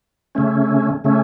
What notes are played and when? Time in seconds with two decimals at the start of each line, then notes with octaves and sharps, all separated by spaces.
0.35 C#3 A3 C#4
1.04 C#3 A3 C#4